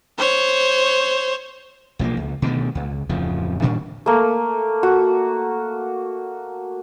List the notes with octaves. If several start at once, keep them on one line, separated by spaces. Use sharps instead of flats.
C5 C#5
B1 F3 G#3 A#3
C#2
B2 D3 D#3 A3
C#2
D1 F2 C#3 F3
A2 D#3 G3 D4
A3 A#3
F#4